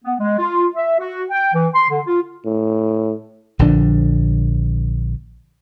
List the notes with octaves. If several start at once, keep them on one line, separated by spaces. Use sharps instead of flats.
B3
G#3
F4
E5
F#4
G5
E3
C6
D3
F4
A2
A#1 D3 F3 D4